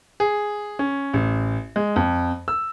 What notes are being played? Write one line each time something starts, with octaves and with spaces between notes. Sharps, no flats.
G#4
C#4
A1
G#3
F2
E6